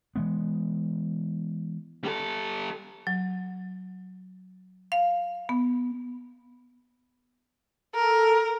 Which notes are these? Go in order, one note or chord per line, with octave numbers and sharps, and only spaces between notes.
E3 G#3 B3
G3 A4
F#3
F5
B3
A4 A#4